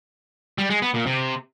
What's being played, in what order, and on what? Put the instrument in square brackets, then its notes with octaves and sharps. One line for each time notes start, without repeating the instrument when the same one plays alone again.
[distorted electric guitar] G3
G#3
B3
A#2
C3